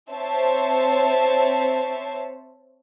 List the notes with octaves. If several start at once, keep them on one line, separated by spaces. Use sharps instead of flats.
C4 C5 C#5 E5 A5